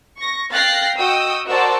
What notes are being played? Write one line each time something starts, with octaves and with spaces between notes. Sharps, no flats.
C#6 A#6
F5 G5 F#6 A6 A#6 C7
F#4 D#5 G5 D#6 E6
F#4 A#4 C5 D5 A5 E6